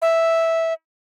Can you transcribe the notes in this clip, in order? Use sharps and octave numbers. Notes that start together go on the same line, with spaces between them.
E5